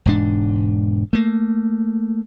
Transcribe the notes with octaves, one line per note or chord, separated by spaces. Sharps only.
E1 G#2 D4
A3 A#3